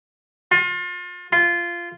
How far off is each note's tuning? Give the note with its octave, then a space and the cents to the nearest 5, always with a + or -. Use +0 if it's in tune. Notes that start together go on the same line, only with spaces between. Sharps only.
F4 +35
F4 -15